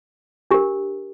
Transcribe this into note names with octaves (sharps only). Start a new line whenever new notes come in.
D4 G4 A#4